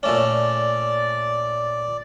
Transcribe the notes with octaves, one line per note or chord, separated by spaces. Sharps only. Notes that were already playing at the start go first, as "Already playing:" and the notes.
A#2 A3 C#4 D5